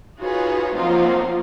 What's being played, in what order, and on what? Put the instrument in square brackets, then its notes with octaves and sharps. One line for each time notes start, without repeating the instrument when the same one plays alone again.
[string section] D#4 F4 F#4 G#4 B4 C#5
F3 F#3 A#3 C4 D#4 F4